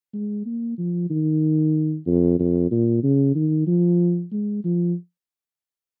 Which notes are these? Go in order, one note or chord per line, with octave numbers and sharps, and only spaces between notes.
G#3
A#3
F3
D#3
F2
F2
A#2
C#3
D#3
F3
G#3
F3